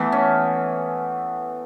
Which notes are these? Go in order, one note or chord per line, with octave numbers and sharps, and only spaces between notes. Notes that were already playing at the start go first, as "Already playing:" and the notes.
Already playing: E3 A3 B3
C#4